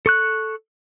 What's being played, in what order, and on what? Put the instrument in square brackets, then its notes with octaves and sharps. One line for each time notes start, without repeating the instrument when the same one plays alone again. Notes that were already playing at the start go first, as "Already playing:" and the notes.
[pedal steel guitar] A4 C#6 F#6